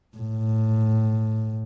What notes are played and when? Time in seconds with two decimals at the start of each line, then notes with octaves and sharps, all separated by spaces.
0.17 A2